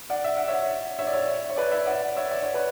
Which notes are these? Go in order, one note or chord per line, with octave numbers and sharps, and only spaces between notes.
D5 F#5
E5
F#5
C#5 E5
C#5 E5
D5
C#5 E5
C#5
B4 D5
C#5 E5
D5 F#5
C#5 E5
D5
C#5
B4 D5